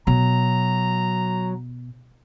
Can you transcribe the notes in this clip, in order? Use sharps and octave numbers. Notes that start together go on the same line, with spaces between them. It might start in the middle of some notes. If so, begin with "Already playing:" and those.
B2 F#3 A#5